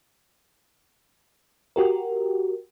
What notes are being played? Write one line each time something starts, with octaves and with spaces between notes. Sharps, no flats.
F#4 G4 A#4